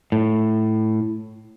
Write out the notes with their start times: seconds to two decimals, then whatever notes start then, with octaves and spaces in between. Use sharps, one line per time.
0.12 A2